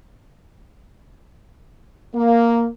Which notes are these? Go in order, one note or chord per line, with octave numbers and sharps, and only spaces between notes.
A#3